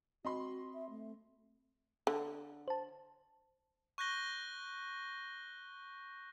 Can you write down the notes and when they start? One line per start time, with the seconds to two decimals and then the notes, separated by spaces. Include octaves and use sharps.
0.25 C4 F#4 D#5 B5 C6
0.74 E5
0.90 A3
2.07 D3
2.68 C5 A5
3.98 C#6 F#6 G6 A#6 G7